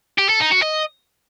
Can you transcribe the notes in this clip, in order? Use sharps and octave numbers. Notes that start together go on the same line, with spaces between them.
G4
A4
D#4
F#4
D#5